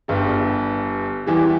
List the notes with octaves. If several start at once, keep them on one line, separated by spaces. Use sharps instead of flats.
G1 G2 G3
E2 E3 G3